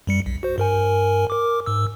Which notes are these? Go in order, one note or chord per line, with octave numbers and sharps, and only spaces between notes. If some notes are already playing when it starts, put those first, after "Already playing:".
F#2 G3 C#7
B1
F#4 C5
G2 A#4 G#5
A#4 D6
G#2 E6